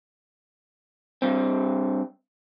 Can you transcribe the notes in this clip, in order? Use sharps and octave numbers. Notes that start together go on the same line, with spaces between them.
G2 C4